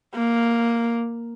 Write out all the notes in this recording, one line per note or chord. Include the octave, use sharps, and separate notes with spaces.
A#3